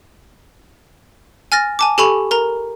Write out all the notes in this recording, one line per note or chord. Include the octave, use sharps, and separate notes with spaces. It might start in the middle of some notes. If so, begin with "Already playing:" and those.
G#5 F6 A6 A#6
G#5 A5 D6
G4 A4 G#5 B5 C#6 F7
A#4 A#5